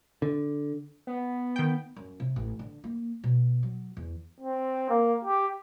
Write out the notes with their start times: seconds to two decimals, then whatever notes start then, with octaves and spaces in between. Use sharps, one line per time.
0.22 D3
1.07 B3
1.56 D#3 G5
1.96 F#2
2.20 C3
2.36 A1
2.59 D3
2.84 A#3
3.24 B2
3.63 F#3
3.97 E2
4.40 C4
4.90 A#3
5.25 G4